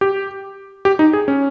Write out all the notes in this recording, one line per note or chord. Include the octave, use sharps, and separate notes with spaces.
G4
G4
D#4
G#4
C#4